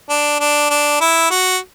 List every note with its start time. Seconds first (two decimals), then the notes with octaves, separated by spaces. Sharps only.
0.10 D4
0.40 D4
0.70 D4
1.01 E4
1.31 F#4